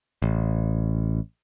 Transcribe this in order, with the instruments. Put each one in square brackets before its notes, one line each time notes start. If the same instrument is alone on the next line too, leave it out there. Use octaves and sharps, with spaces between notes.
[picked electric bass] A1